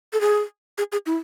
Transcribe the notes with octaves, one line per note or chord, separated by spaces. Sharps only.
A4
G#4
G#4
G#4
E4